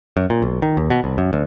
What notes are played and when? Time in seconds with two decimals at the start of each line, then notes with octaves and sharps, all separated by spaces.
0.17 F#2
0.30 A#2
0.42 B1
0.62 D#3
0.77 D#2
0.90 B2
1.04 C2
1.18 F#2
1.33 D2